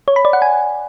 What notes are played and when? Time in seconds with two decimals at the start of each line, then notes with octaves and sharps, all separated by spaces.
0.08 C#5
0.16 B5
0.25 D5
0.33 F#5
0.42 G#5